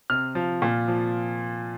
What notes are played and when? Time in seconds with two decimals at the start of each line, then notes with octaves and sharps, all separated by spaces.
0.10 C3 F6
0.35 F3
0.62 A#2
0.88 F3